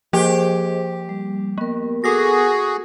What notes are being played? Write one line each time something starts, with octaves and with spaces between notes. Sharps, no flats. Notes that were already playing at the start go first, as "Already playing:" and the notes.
F3 A#3 G4 G#4 C5 D#5
G3
A#3 B3 A#4
F#4 G#4 A4 D#6 A#6